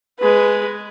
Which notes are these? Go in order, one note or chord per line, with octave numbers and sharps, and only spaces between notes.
G#3 B4